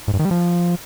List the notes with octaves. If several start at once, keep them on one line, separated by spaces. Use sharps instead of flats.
G#2
G2
D#3
G3
F3